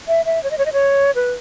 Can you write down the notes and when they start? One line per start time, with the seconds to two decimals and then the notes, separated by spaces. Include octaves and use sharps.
0.08 E5
0.25 E5
0.43 C#5
0.51 D#5
0.58 C#5
0.66 D#5
0.73 C#5
1.15 B4